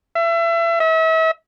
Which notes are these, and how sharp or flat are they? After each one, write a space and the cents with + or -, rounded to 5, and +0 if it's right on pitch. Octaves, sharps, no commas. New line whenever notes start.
E5 +30
E5 -40